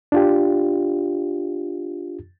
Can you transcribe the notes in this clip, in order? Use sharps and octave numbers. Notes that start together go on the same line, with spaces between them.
D4 F4 G4